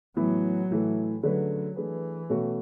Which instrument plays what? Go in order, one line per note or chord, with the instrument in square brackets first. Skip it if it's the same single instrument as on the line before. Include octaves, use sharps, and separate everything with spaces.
[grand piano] A2 E3 B3 [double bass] F#3
[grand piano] A2 E3 A3
[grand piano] D3 A3 C#4 G#4 B4 [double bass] F#3
[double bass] E3 [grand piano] A3 D4 G#4 B4
[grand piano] B2 A3 C#4 F#4